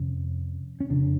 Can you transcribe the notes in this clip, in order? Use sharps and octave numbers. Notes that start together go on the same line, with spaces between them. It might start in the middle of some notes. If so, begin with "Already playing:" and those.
Already playing: F2 C3 C#4
C#4
F2 C#3 D4